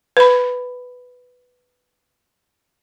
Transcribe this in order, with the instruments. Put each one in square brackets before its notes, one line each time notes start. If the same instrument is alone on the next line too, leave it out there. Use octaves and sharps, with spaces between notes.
[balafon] B4 B5